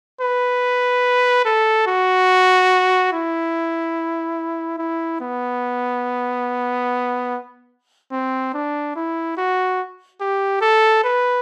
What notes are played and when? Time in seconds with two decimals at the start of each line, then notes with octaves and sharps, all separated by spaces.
0.21 B4
1.45 A4
1.87 F#4
3.12 E4
4.78 E4
5.20 B3
8.11 C4
8.54 D4
8.96 E4
9.37 F#4
10.21 G4
10.61 A4
11.04 B4